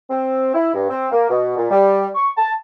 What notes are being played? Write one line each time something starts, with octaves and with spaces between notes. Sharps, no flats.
C4
E4
G2
C4
A#3
B2
A#2
G3
C#6
A5